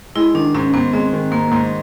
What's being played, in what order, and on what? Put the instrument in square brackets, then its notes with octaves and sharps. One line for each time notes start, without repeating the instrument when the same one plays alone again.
[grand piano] G#3 [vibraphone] E4
[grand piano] D#3 [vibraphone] D4
[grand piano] G#2 [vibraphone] C#4
[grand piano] G#2 [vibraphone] B3
[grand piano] G#3 [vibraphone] C4
[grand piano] D#3
[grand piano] G#2 [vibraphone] A#3
[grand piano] G#2